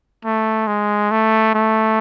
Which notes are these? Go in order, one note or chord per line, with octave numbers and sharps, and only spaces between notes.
A3
G#3
A3
A3